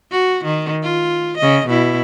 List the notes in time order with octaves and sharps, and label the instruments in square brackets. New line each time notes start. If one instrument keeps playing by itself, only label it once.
[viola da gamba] F#4
D#3
F4
C#3 D#5
B2 E4